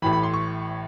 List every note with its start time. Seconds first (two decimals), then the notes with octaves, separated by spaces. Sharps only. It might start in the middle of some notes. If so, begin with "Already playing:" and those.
0.02 A1 A2 E3 B5
0.13 B5
0.23 C6
0.34 C#6